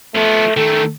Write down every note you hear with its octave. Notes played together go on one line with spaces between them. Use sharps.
F3 A3 B3
D#3 A3 A4